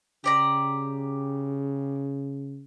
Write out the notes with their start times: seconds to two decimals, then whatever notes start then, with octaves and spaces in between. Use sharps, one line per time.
0.24 C#3 G4 D5 A#5